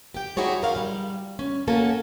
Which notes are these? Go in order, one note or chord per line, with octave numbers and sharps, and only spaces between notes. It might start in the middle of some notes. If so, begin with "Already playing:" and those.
G4 G5
D#4 E4 F#4 G#4 C#5 D5
F4 A#4 F5 F#5
G3
C#4
A#3 C#4 F#4 A4 G#5 A5